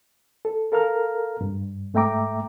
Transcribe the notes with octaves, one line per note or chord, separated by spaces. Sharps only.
A4
A4 A#4 F5 A#5 F6
G2
G#2 A3 E5 G5 A#5 D6